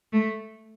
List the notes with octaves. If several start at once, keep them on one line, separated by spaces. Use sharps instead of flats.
A3